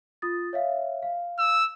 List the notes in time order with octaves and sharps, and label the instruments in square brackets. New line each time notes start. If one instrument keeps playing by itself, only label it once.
[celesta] F4 D#6 A6
C#5 E5 F5
F5
[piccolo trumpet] E6